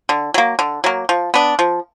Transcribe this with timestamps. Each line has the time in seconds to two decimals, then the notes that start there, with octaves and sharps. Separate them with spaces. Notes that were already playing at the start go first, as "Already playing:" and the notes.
0.09 D3
0.34 F#3 A#3
0.59 D3
0.84 F#3 A#3
1.09 F3
1.34 B3 D4
1.59 F3